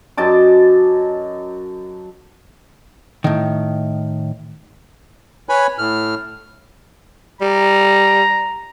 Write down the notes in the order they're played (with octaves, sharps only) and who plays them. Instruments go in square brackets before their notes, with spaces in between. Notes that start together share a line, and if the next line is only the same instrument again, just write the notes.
[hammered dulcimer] F#2 D#5 A5 D6
[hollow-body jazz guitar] A2 D#3
[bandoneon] B4 C#5 G#5 B5
A2 F6
[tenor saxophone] G3 [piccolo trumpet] A#5